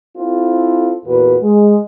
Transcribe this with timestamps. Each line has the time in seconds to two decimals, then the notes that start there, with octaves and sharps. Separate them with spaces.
0.16 C4 E4 F4 A4
1.06 E2 A#2 F#4 B4
1.42 G#3